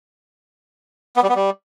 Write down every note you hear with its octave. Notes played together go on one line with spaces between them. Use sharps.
B3
G3
B3
G3